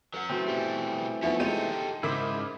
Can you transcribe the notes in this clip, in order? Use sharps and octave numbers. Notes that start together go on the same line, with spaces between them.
F#3 C#4 B4 F#5
E3 A3 C4 F#4 C5 G5
B2 G3 G4
F3 B3 D4 D#4 B4 C#5 E5
C3 G#3 G4 A4 C#5 D#5 C6 D#7
G#2 C#3 E4 A#4 C5 D6 B6